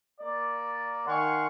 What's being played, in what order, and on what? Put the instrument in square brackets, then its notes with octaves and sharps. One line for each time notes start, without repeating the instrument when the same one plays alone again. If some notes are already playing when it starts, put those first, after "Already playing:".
[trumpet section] A#3 D5
[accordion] D#3 F#5 C6 [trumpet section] F5 G#5 C#6